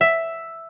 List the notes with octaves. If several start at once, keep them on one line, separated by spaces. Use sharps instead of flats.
E5